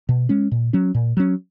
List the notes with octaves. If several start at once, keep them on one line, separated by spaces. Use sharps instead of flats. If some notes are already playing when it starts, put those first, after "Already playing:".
B2
G#3 C#4
A#2
F#3 C#4
A#2
F#3 C#4